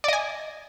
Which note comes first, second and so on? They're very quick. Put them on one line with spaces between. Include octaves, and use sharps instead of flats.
D5 D#5 G#5